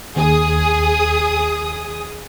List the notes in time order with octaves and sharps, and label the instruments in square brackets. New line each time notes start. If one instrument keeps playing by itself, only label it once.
[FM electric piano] D#2 [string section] G#4 D#6